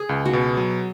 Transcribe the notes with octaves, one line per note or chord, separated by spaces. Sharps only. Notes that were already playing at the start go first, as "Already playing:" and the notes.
Already playing: G#4
C#2
F#4
B2
F#3